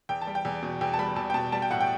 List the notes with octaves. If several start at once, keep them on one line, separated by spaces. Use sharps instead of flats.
E2 G5
A5
G3
G5
E2
B2
E2 G5
A5
G3 B5
E2 A5
G5
B2 A5
G3 A5
G5
A2 F#5
G5